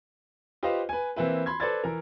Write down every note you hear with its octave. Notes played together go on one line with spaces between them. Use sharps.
F4 G4 B4 C5 D#5 F5
B4 G#5
E3 A#3 C4 E4 B4
B5 C6 G#6
A4 B4 C5 D5 G#6 A6
E3 A#4